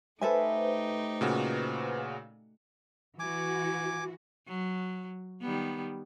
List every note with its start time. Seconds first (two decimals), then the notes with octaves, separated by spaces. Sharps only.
0.21 A3 D#4 G4 A4 B4 C5 E5 G#5
1.21 A#2 C#3 F#4
3.19 E3 F#4 G#5 D6
4.48 F#3
5.41 D#3 G3 B3